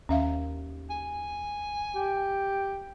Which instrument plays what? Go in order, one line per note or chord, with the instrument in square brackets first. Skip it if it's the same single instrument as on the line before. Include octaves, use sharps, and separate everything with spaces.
[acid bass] D#2 [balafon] C#4 E5 F5
[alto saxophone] G#5
[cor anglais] G4